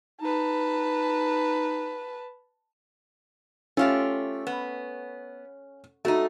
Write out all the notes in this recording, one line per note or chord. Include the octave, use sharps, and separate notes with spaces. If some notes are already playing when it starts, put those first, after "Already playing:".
D#4 B4 A5
A3 C#4 F4 G4
B3
A3 D#4 F#4